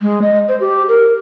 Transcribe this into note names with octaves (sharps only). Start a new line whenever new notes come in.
G#3
D#5
C5
G4
A#4